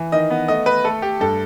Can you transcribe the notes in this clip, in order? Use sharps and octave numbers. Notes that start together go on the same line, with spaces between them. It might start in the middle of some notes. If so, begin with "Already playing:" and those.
Already playing: E3
D#3 D#5
B3
A3 D#5
A3 B4
A3 A4
A3 G4
G2 A4